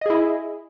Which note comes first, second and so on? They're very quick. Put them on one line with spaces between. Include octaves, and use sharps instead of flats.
D#5 G#4 E4